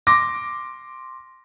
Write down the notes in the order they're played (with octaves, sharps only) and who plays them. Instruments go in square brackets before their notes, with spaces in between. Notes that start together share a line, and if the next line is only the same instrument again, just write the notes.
[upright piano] C6 D6 A#6